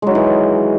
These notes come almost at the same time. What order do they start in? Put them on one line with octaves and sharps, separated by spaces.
G#3 F#3 D#3 E3